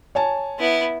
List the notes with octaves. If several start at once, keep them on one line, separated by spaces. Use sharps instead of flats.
C#5 G#5 A5
B3 E4